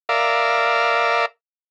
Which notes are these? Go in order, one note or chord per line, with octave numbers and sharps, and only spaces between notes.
A#4 D5 E5 F5